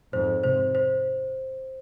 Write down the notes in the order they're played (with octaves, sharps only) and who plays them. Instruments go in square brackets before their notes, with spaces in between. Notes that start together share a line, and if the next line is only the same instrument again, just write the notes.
[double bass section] F2 G#2 [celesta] C5
[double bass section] G#2 C3 [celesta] C5
[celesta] C5